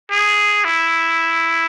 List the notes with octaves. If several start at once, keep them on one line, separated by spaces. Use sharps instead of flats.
G#4
E4